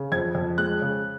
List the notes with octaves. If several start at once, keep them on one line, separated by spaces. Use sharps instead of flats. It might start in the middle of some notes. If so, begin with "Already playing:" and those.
Already playing: C#3
F2 G#6
F2
G#3 F#6
C#3